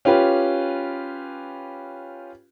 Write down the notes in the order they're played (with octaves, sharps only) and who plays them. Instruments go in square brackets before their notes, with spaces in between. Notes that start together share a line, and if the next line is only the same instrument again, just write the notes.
[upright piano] C#4 F4 G4 B4